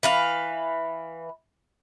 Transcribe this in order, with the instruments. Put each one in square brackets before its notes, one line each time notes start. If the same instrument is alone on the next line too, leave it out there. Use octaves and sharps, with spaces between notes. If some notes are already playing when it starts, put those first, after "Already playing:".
[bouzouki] E3 B4 F5